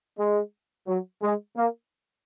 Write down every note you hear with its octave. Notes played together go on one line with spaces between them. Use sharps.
G#3
F#3
G#3
A#3